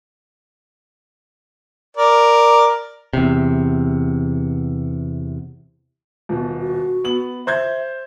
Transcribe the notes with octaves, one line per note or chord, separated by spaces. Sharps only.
A#4 D5
E2 C3
D#1 B2
F#4
B3 F#7
C5 E5 G6 G#6